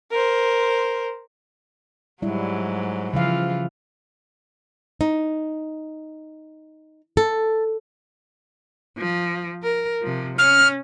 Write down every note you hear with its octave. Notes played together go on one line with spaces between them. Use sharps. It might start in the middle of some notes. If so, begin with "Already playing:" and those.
A#4 C5
G#2 F#3 G3 E4
C#3 E3 F3 F4 F5
D#4
A4
F3
A#4
C3 F3
C#4 F6